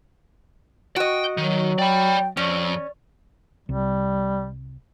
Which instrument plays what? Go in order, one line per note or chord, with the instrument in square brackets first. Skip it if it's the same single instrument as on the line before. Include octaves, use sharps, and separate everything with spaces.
[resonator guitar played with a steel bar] F#4 D#5 [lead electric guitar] G5
[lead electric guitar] D#3 [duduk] F#3
[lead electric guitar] D5 B5 [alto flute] G5
[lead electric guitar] F2 [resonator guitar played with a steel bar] C#4 [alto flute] D5
[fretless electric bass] C2 [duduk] G3